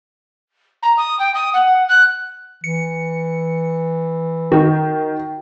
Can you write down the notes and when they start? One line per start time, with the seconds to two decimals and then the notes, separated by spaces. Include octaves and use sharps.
0.82 A#5
0.97 D#6
1.19 G5
1.34 D#6
1.53 F#5
1.88 F#6
2.64 E3 C#7
4.52 D#3 F#4